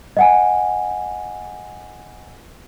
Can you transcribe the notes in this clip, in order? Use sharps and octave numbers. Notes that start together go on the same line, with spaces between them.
D#5 F#5 G#5